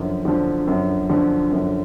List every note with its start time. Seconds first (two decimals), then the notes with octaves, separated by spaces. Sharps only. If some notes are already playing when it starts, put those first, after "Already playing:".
Already playing: F#2 D3 F3
0.25 D3 F3
0.67 F#2
1.10 D3 F3
1.51 F#2